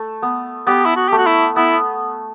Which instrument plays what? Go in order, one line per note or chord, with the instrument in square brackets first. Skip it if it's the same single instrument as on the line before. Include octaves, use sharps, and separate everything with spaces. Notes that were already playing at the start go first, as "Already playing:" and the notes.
Already playing: [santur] A3
B3
[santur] B3 [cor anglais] G4
[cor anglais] E4
F#4
[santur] A3 [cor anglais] G4
[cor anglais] F#4
E4
[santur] B3 [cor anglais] E4